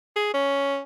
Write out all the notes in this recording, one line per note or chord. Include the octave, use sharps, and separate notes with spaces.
G#4
C#4